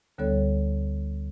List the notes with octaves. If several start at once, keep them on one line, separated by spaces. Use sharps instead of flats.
D2 D3 G3 B3 A4 C#5